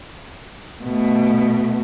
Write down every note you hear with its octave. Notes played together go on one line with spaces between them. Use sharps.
B2 A3